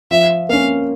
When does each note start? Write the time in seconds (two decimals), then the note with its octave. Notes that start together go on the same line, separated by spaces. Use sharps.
0.11 F3 E5
0.49 A#3 C#4 F5